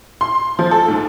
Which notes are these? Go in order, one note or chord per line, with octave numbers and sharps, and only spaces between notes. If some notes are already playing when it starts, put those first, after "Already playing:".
C6
F3
A4
G#2